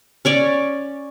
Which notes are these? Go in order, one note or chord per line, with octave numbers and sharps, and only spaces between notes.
C#4 C#5 D5